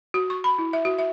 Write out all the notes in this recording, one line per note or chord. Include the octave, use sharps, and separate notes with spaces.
F#4
C#6
B5
E4
E5
F#4
E5